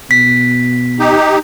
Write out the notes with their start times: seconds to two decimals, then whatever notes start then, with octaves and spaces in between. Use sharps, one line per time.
0.11 B2 B6
0.99 D#4 G4